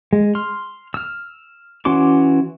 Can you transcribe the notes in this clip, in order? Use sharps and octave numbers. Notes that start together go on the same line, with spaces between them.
G#3
C6 F6
E6 F6
E3 C#4 F#4 C6 D6